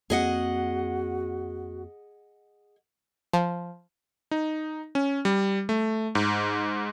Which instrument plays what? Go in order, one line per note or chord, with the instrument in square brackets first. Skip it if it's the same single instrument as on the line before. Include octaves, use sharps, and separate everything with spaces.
[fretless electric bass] F2 A#3 C4 [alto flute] F#4 [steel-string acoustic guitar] G#4 D#5 F#5
[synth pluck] F3
[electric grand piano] D#4
C#4
G3
A3
G#2